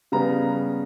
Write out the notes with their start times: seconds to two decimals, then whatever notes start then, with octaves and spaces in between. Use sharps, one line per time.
0.12 C#3 G3 B3 A#5